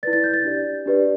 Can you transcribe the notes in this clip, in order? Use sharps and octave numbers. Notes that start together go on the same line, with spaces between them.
E4 B4 D5 A6
A6
G6
A6
D4 G4 D5
D4 G4 B4 D5